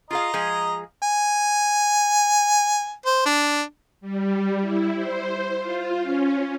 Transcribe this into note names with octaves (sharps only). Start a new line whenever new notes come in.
F4 G#4 D#5 F5 A#5
F3 G#3 G#4
G#5
C5
D4
G3
E4
C5
F4
C#4